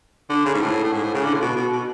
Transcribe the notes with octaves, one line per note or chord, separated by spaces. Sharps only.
D3
C#3
G#2
A2
A2
G#2
A2
C#3
D3
A2
B2
B2
B2